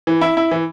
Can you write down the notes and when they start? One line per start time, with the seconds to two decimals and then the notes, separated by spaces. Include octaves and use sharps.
0.07 E3
0.21 E4
0.37 E4
0.51 E3